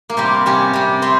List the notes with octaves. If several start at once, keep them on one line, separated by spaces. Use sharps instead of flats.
A#3
C3 G3 C4
C3 G3 C#4
C3 G3
C3 C4